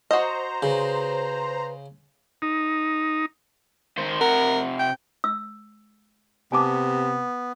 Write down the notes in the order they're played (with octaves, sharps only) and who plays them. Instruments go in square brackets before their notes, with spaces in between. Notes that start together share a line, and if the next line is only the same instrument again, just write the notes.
[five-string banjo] F#4 D#5 [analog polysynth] C5 A#5
[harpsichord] C#3 [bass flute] B4
[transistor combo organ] D#4
[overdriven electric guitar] D#3 C5
[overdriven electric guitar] C3 F#5 [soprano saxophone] A#4
[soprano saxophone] G5
[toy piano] E6
[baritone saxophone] C3 [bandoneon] B3 [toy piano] G#5 A5 D6